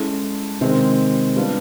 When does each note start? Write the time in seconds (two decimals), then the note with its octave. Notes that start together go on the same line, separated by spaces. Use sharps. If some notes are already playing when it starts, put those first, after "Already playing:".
Already playing: G#3 C#4 E4 A4
0.61 C3 D#3 G#3 C4
1.36 G3 B3 D4 F4